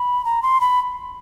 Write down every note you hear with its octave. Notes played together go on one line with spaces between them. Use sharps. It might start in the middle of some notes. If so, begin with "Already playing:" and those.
Already playing: B5
A#5
C6
B5